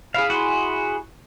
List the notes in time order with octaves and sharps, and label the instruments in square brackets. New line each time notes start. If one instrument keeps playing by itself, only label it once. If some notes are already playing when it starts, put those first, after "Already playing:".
[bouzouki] E4 G#4 [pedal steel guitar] F5
[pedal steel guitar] F#4 C6